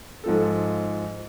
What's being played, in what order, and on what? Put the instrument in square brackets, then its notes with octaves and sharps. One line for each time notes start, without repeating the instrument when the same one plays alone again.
[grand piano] G#2 F3 A4